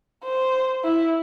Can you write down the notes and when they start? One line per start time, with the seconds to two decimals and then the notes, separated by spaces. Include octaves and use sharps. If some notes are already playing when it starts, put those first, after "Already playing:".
0.24 C5
0.84 E4